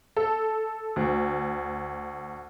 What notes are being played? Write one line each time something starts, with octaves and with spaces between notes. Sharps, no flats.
A4
D2